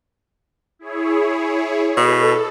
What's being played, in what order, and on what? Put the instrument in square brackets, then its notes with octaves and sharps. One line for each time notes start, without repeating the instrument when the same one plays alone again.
[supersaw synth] E4 G#4 C#5
[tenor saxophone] B2 [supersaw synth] A4